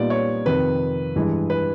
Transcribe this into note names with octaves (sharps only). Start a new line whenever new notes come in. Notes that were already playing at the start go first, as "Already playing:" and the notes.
Already playing: A#2 G3 B3 D#4 D5
C#5
F2 C3 D#3 B4
G2 E3 G#3
B4